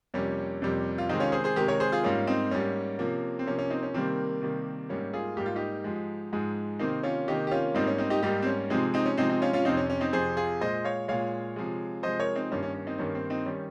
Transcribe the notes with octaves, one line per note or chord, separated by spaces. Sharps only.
F2 C3 G3 A#3 C#4
F2 C3 G3 A#3
F4
C3 D#3 G#3 C4 D#4
C#4 F4
G#4 C5
G#4 C5
C3 D#3 G#3 G4 A#4
A#4 C#5
G#4 C5
F4 G#4
G#2 G3 A#3 C#4 F4
C4 D#4
G#2 G3 A#3 C#4
C3 F3 A#3
C4
C3 F3 A#3 C#4
C#4
C4 D#4
C#4
C3 D#3 G3 A#3 C4
C3 D#3 G3 A#3
G#2 G3 A#3 C#4
F4 G#4
G#2 G3 A#3 G4
F4
D#4 G4
G#2 F3 G#3
G#2 F3 G#3
C3 D#3 A#3 C4 D#4
C#4 F4
C3 D#3 A#3 D#4 G4
G4
C#4 F4
G#2 G3 A#3 C4 D#4
C#4
C4 D#4
D#4 G4
G#2 G3 A#3 D#4 G4
C4
C#4
C3 F3 G#3 C4 D#4
C4 D#4
C#4
C3 F3 G#3 C4 D#4
C4 D#4
C#4 F4
C#4 F4
F2 C3 F3 C4 D#4
C#4
C#4
C4 D#4
F2 C3 F3 G#4 C5
F4 G#4
A#2 G#3 C5 D#5
C#5 F5
A#2 G#3 C#5 F5
C3 F3 G#3
C3 F3 G#3 C5 D#5
A#4 C#5
C4 D#4
G2 D#3 A#3 C#4
C#4
C#4
C4 D#4
G2 D#3 A#3 C#4
C4
C4 D#4
D#3 G3 C#4